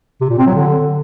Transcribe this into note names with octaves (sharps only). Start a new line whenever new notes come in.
C3
A#2
C4
F#3
D3